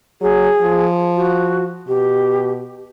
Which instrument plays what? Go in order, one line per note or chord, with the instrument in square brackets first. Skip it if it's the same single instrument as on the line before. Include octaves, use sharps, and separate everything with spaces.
[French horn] F#3 [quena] G#4
[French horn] F3
[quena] F#4
[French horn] B2 [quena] G4